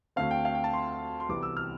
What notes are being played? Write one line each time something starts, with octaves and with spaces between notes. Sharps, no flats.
D2 D3 A3 C4 F5
G5
F5
G5
A5
C6
C6
C2 C3 E3 B3 D6
E6
F6